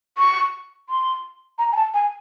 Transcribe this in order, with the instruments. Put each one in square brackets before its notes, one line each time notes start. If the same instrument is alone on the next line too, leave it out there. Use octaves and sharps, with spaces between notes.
[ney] C#6
C6
A#5
G#5
A5
G#5